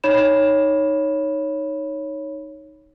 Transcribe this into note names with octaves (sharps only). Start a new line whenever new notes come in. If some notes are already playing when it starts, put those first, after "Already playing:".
D#4 C#5 B5 E7